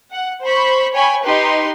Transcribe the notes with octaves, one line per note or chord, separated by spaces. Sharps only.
F#5
C5 B5 C#6
C#5 G5 G#5 B5 C#6
D#4 G4 B4 C6